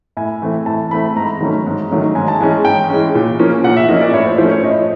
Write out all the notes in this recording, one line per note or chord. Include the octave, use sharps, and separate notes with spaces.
A2 G#5
E3 A3 C4
A2 A5
E3 A3 C4 B5
G#2 A#5
D#3 F#3 A3 C#4
G#2
D#3 F#3 A3 C#4
G#2 G#5
A5
E3 G#3 C#4 G#5
G#2 G5
E3 G#3 C#4
A#2
F3 A#3 C#4
A#2 F#5
E5
F3 A#3 C#4 D#5
D5
A2 C#5
C5
F3 A3 C#4 C5
C#5
A2 D#5